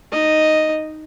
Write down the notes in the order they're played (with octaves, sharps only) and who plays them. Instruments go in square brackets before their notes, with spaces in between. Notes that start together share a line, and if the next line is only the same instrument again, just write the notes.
[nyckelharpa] D#4 D#5